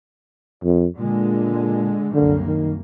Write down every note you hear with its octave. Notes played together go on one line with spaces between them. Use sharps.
F2
A#2 D3 G#3
C2 F#2 D3 A#3
D#3